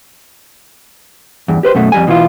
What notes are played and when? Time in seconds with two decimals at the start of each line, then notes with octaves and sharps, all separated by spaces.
1.48 E2 G2
1.63 G4 B4 C5
1.75 F#2 B2 A3
1.92 F2 G3 G#5
2.07 B2 E3 E4 F4